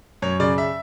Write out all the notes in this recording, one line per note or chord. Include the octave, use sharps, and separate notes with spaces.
F#2 C#5
C#3 D5
E5